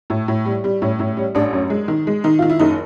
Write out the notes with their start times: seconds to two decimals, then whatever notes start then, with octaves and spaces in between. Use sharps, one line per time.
0.10 A2
0.28 A2
0.45 G3
0.64 G3
0.82 A2 C#4
0.99 A2 C#4
1.17 G3 C#4
1.35 A1 D4
1.53 F#2 C#4
1.70 G#3
1.88 D#3
2.07 G#3
2.24 D#3 D#4
2.39 D#3 F4
2.50 E4
2.59 F#1 D#4